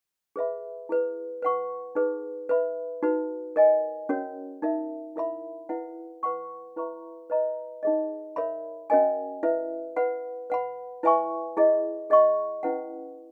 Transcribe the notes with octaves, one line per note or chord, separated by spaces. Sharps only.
G#4 B4 E5 B5
E4 G#4 B4
B4 F#5 C#6
D#4 G#4 B4
B4 E5 B5
D#4 F#4 B4
A#4 D#5 G#5
C#4 F#4 A#4 C#5
D#4 A#4 E5
E4 A#4 E5 B5
E4 B4 F#5
B4 F#5 C#6
E4 B4 E5 A#5 C#6
B4 D#5 A#5
D#4 G#4 D#5
A#4 C#5 E5 B5
C#4 F#4 A#4 D#5 G#5
E4 B4 E5
B4 F#5 B5
B4 F#5 B5
E4 B4 E5 G#5 C#6
E4 G#4 D#5
G#4 D#5 F#5 C#6
C#4 E4 B4 F#5